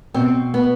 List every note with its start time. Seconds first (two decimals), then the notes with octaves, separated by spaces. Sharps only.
0.14 B2 C4
0.54 B3